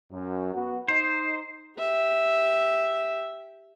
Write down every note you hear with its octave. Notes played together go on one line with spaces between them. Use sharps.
F#2
B3 F#4
D#4 C5
G4 E5